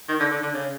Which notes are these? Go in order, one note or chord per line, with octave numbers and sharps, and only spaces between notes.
D#3
D3
D3
D3
C#3